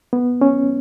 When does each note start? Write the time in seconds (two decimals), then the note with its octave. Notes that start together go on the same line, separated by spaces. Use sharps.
0.13 B3
0.41 C#4